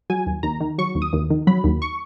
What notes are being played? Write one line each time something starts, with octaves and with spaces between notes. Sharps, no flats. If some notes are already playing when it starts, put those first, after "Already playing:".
F#3 G#5
D#2
D#2 A#5
D#3
F#3 C#6
D#2
D#6
D#2
D#3
F#3 B5
D#2
C#6